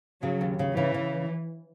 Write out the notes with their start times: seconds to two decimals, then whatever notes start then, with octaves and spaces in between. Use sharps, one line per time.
0.22 C#3 F#3
0.41 D#2
0.59 C#3
0.77 C#3 E3
0.94 C#3